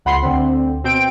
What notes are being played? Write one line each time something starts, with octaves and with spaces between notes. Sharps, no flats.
C#2 F#5 B5 C6 C7
D2 D3 C4
B2 C4 G5 D7